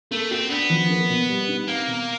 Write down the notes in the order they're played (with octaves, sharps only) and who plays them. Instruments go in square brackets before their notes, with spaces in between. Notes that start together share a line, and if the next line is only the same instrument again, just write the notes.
[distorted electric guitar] A3 [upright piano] A#3
[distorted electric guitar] C4 [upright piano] F#4
[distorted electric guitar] B3 [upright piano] D4
[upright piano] F3
A#3
B2
G3
D#4
[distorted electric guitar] A#3 [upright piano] C4
[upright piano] B2